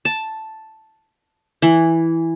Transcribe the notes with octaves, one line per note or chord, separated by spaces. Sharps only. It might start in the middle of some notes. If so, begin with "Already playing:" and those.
A5
E3